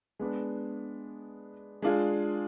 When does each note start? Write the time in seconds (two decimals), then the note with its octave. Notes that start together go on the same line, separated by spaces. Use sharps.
0.20 G#3 B3 D4
1.82 G#3 D4 F4 G#4